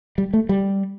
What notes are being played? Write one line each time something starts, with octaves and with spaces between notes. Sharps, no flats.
G3
A3
G3